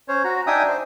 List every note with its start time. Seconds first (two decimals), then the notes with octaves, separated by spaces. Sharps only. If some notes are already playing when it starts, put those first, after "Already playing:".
0.08 C#4 C5 C#5
0.24 F#4 A#5
0.47 D4 D#4 E5 G5 G#5 D#6
0.68 C5